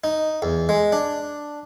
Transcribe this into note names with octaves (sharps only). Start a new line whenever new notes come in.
D#4
E2
G#3
D4